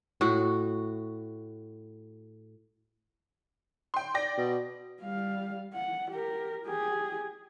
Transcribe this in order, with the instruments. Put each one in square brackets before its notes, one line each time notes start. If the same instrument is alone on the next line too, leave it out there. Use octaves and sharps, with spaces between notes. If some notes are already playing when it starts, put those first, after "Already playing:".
[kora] A2 F#4
[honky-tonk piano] G5 C6
D5 G5 A#6
[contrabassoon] B2
[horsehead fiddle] G3 F5
F#5
G4 A#4
G4 G#4